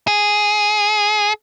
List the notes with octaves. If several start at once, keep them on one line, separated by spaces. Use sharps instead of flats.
G#4